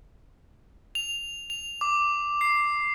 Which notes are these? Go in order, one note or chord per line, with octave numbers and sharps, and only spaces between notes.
F7
F7
D6
C7